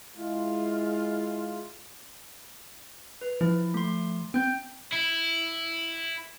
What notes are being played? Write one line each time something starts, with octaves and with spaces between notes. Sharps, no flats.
G#3 E4 F4
B4
F3 E4
A3 C6
C4 G5 G6
E4